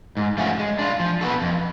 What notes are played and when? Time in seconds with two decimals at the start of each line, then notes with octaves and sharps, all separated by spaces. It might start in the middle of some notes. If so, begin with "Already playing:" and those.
0.17 G#2
0.37 F3 A3 C#4 F#4
0.59 G#3
0.79 D4 F4
1.00 F3
1.21 B3 F#4 A4
1.42 F2